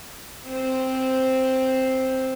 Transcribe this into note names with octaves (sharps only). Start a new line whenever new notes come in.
C4 C5